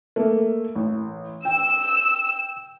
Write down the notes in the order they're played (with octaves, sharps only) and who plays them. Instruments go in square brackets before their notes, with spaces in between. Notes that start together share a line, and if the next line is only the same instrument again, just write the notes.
[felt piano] A3 A#3
A1
[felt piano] G5 [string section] E6